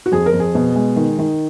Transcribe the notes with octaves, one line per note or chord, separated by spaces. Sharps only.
F#4
F2 G#4
A#4
F2
G#4
B2
G#3
D#3
D#3